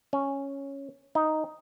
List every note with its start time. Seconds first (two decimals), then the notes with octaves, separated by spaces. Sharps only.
0.13 C#4
1.15 D#4